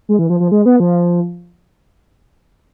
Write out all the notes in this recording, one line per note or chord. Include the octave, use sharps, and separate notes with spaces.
G#3
E3
F3
F3
G#3
B3
F3